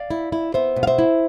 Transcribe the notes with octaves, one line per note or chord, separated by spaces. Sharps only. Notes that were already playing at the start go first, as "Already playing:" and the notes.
Already playing: D5 F5
E4
E4
B3 C5 E5
B2
F5
C5 E5
E4